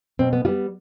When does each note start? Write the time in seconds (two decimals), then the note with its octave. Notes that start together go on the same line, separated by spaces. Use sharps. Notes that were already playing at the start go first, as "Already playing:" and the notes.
0.19 B2 C4
0.33 B3
0.45 G3 B3 F4